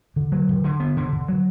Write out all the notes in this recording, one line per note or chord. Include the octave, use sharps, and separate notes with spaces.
D3
F#3
D3
D3
B3
D3
D3
F#3